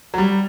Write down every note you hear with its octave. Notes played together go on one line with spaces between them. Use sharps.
F#3
G3